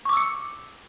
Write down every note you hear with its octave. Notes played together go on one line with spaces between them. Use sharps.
C#6 D6 E6 C#7